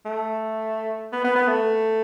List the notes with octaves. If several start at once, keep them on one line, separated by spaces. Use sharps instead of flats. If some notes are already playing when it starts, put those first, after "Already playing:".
A3
B3
B3
B3
A3